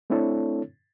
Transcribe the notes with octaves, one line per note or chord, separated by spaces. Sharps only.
A3 C4 D4 E4 A4 C#5